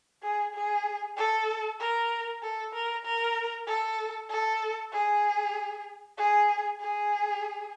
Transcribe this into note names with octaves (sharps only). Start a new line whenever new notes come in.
G#4
G#4
A4
A#4
A4
A#4
A#4
A4
A4
G#4
G#4
G#4